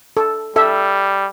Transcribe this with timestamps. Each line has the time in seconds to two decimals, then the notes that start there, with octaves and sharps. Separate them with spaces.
0.17 A4
0.56 G3 A4 E5